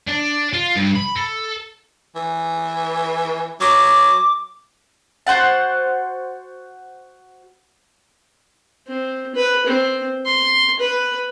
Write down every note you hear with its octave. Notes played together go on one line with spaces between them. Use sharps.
D4
F4
G2
B5
A4
E3
F#3 D6
F#4 C5 F#5 A5
C4
B4
C4
C6
B4